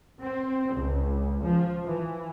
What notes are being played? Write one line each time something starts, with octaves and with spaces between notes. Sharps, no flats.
C4
C#2
F3
E3